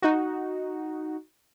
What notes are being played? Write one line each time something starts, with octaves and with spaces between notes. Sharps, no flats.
D#4 F#4